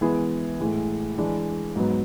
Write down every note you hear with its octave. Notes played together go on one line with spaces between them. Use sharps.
E3 G#3 B3 E4 G#4
A2 E3 G#3
E3 G#3 D4
G#2 F#3 B3